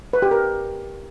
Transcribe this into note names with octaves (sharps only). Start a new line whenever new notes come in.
B4
G4
A#4